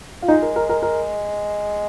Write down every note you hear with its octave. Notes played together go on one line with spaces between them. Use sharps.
F4
G#3 D#4
A#4
A#4
A#4
A#4